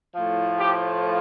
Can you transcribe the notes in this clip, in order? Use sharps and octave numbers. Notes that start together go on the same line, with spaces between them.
A2 F3
G4